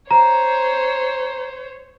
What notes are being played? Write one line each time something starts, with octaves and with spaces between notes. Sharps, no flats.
C5 C#5 A#5